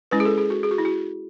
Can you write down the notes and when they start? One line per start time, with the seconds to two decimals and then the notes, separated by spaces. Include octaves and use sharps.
0.11 G#3 C#4 E4 B4
0.20 G#4
0.25 A4
0.38 G#4
0.50 F#4
0.63 G#4
0.71 F#4
0.78 E4
0.85 F#4